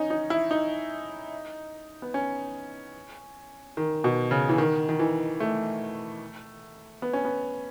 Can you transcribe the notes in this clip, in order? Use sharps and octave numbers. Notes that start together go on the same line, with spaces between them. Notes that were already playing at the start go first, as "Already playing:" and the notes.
Already playing: C#4 D#4
D#4
E4
D#4
B3
C#4
D#3
B2
C#3
E3
D#3
D#3
E3
A3
B3
C#4
B3